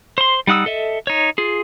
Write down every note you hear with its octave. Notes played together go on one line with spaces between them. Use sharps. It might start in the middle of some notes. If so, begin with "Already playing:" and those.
C5 C6
G3 D#4 F#5 D#6 E6
A4 D#5 E5
D#4 C#5
F4 G#4